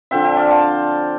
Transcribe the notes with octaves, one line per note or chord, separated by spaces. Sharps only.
D3 F3 C4 E5 G5
E5 G5
D5 F5
F5 A5